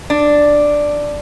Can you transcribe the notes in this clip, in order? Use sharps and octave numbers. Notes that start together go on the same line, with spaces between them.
D4